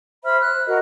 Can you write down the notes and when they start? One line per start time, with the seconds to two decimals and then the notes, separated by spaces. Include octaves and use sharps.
0.25 C5 E5 B5 F6
0.41 F#6
0.67 F#4 A#4 D#5